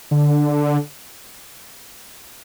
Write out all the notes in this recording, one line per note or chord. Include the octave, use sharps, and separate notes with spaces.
D3